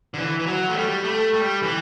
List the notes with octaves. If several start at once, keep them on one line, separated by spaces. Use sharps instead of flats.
D3
E3
E3
F#3
A3
G3
A3
G3
E3